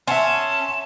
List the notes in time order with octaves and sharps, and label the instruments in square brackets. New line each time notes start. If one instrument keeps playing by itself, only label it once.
[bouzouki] C#4 [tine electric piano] E5 F#5 C6 [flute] A5